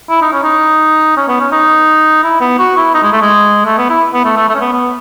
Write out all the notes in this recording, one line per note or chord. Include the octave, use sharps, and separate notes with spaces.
E4
D#4
C#4
D#4
C#4
B3
C#4
D#4
E4
B3
F#4
E4
D#4
G#3
A3
G#3
A3
B3
E4
B3
A3
A3
A3
C#4
B3
B3